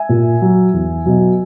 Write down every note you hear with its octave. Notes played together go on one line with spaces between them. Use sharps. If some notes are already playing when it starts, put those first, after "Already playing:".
Already playing: E5 G#5
A#2
F#3
E2
B2 F#3